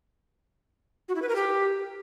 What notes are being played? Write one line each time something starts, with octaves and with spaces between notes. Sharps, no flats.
F#4
E4
B4
A#4
G4